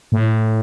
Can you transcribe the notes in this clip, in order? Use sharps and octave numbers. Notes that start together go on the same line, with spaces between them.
A2